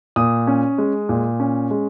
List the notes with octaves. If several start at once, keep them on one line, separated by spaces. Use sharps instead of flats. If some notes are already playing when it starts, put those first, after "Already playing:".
A#2 D#6
C#4
G#3
A#2
C#4
G#3